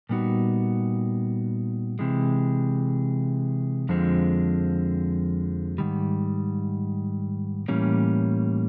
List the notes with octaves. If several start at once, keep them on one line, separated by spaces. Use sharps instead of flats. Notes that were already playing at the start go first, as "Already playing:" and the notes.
A#2 G3 B3 D#4 F#4
C3 E3 G#3
F2 D3 F3 G#3 C4
G#2 D#3 G3
A2 E3 G3 A#3 C#4